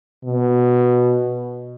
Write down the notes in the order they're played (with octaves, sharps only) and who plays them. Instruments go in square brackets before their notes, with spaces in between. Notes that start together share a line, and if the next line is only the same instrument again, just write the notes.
[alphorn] B2